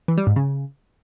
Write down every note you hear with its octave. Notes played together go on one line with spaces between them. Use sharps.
E3
G3
G#2
C#3